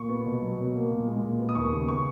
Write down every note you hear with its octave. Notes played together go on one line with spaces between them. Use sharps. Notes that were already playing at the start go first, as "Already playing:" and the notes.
Already playing: A#2 C#6
B3
B2
F#3
B2
A#3
A#2
G#3
A#2
B3
D#6
D#2 C#6
C#3
B3 C#6